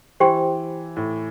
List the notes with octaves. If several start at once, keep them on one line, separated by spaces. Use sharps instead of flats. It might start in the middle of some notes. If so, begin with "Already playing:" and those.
E3 G4 C5 G5 C6
A2